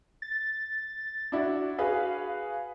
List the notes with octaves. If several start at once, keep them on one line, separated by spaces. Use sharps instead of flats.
A6
D4 E4 F#4
F#4 G#4 B4 F5